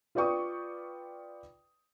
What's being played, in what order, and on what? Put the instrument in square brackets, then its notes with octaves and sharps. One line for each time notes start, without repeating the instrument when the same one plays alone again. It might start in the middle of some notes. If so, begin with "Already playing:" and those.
[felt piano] F4 B4 D5 G5 C#6 D#6